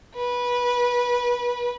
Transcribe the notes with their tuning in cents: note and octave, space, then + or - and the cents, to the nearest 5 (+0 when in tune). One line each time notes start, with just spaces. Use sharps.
B4 -20